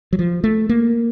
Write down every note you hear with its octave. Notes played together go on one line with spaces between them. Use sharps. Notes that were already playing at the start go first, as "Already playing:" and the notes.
F#3
F3
A3
A#3